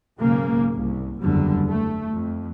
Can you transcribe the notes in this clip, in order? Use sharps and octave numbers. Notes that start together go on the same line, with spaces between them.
B1 G#2 C#3 A#3
C2
F#1 E2 D3 G3
A3
F2